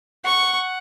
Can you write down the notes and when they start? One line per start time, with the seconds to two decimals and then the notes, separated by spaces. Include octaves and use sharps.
0.25 F#5 C#6